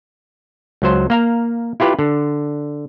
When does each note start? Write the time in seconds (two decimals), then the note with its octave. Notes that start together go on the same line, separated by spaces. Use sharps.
0.82 C#2 F#3 C5
1.10 A#3 F5 A#5
1.80 E4 F4 G4 B4
1.99 D3